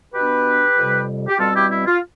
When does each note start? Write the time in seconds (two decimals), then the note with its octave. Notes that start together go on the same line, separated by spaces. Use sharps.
0.14 B2 B3 D4 G4 B4
0.77 F2 C3 G3
1.28 G4
1.39 B2 G3 C4 F4 A4
1.55 E4 G4
1.71 E4
1.87 F4